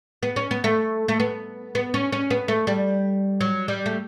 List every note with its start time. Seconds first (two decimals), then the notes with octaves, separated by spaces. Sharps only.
0.23 B3
0.36 C#4
0.51 B3
0.64 A3
1.08 A3
1.20 B3
1.75 B3
1.94 C#4
2.12 C#4
2.30 B3
2.48 A3
2.67 G3
3.41 F#3
3.68 G3
3.86 A3